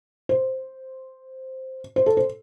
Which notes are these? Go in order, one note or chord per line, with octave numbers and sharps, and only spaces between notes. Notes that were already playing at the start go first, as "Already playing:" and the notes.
C5
C5
A4
C5